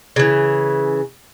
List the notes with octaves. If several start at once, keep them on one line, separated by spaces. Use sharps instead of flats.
C#3 E3